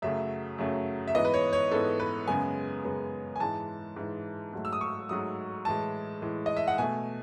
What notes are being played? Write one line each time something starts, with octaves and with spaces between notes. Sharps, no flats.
F#2 C#3 F#3 A3 E5
F#2 C#3 F#3 A3
E5
G#2 E3 B3 D#5
B4
C#5
C#5
G#2 E3 B3 A4
B4
F#2 C#3 G#3 B3 G#5
F#2 C#3 G#3 B3
G#5
G#2 E3 G#3 A5
G#2 E3 G#3
G#2 F#3 A3
E6
D#6
C#6
G#2 F#3 A3 D#6
A2 E3 G#3 A5
A2 E3 G#3
D#5
E5
F#5
B2 A3 G#5